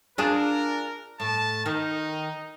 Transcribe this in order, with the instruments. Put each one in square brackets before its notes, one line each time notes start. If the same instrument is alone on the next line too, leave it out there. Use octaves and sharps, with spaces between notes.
[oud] D4 F4 G#4 [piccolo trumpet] A#4
[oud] A2 [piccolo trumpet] A5
[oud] D#3 [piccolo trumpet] D#4